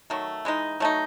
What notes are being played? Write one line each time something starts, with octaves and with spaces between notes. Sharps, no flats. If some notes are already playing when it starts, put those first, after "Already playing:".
D#3 F#3 A3
E3 G#3 D#4
F#3 A3 D#4